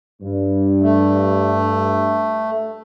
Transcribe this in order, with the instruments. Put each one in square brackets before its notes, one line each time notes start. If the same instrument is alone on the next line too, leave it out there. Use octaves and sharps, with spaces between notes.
[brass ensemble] G2
[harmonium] A3